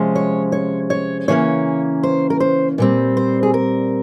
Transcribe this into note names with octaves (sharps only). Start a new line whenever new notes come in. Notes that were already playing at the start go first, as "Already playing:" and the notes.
Already playing: C3 F3 G#3 C#4
C#5
C#5
C#5
C#3 E3 A#3 C#4 C#5
C5
A#4
C5
A#2 G3 C4
C5
G#4
A#4